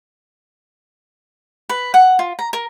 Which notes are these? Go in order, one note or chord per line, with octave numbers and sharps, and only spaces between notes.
B4
F#5
F4
A#5
A#4